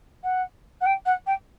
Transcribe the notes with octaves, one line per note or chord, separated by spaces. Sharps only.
F#5
F#5
G5
F#5
G5